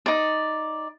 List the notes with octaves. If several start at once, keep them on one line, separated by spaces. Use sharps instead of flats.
D#4 D5